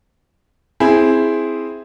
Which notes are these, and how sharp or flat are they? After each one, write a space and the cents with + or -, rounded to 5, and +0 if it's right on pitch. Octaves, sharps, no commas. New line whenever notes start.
C4 +0 E4 +0 G#4 +0